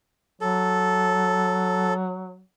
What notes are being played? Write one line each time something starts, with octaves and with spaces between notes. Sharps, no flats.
F#3 A4